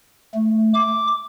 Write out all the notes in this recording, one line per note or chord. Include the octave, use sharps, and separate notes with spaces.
A3
D6